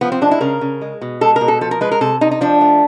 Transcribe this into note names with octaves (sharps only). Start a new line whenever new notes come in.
F3 B3
C4
G#3 D4
E4
C#3 A#4
C#3
G#3
B2
G#3 A4
A#4
B2
A4
F3 A4
A#4
G#3 B4
A#4
C3 A4
C3 D#4
D#4
F3 D4
A3